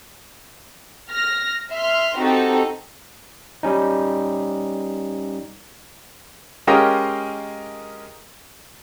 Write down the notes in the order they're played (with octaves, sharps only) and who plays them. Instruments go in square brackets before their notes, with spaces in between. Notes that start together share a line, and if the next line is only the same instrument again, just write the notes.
[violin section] F6 A#6
E5 C6 F6
C4 D#4 F#4 G4 A4
[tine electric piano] G3 C#4 D#4
[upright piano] G#3 C#4 G4 A#4 D#5 F5